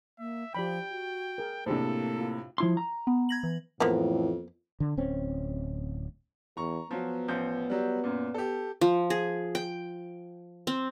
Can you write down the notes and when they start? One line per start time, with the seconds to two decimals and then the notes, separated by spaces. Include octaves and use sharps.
0.19 A#3 E5
0.55 F3 G4 D5 G5 B5
0.91 F#4
1.38 G#4 A#4
1.66 A2 C3 A#3 D4 G#4 A4 C5
2.21 F4
2.58 F3 E4 C6
2.77 A#5
3.07 B3
3.29 G#6 A#6 F#7
3.43 E3
3.80 F2 A2 E3 F3 A#3 B3
4.80 D3
4.97 D1 C4 C#4
6.57 E2 A#5 C#6
6.91 F3 F#3 B3
7.28 A1 F3 G6
7.70 F#3 G3
8.04 F#2 A#2
8.34 G4 A4
8.81 F3
9.10 G#4
9.55 G5
10.67 C4